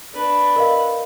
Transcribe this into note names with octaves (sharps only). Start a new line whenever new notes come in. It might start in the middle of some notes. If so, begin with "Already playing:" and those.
D4 B4
A#4 D#5 F5